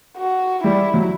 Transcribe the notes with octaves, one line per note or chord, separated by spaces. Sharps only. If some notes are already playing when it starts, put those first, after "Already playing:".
F#4
G3 E4
F#3